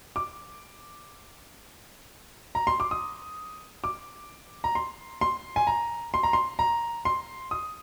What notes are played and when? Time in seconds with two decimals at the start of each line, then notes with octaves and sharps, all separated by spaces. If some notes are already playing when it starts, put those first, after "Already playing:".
0.16 D6
2.55 A#5
2.67 C6
2.80 D6
2.91 D#6
3.84 D6
4.64 A#5
4.75 C6
5.21 C6
5.56 G#5
5.67 A#5
6.14 C6
6.23 A#5
6.33 C6
6.59 A#5
7.05 C6
7.51 D#6